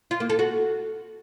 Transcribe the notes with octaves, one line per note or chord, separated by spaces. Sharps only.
F4
A#3
A4
F#4